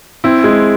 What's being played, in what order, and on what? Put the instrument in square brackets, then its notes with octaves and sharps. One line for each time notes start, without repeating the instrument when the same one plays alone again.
[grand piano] C4 E4
G#3